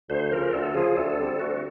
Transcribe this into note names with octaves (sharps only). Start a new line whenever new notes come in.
D2 C5
C#3 F3 A#4
D2 A4
C#3 F3 G#4
D2 A4
D3 G3 C4
D2 F#4